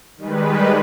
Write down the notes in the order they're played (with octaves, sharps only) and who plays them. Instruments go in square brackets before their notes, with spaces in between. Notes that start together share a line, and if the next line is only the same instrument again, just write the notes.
[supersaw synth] D#3 G3 G#3 B4